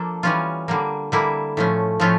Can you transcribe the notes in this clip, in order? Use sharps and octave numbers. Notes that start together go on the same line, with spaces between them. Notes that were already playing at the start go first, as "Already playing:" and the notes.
Already playing: F3 A#3 D4 A4
E3 G3 C#4 F4
D3 G3 A#3
D3 G3 A#3 E4
A2 F3 A3 C#4
A2 F3 A3 C#4 F4